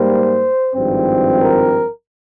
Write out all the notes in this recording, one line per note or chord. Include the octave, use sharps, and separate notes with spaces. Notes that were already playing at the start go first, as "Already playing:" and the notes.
Already playing: G#2 G3 A#3 C5
G#1 G2 F3 C4
A#4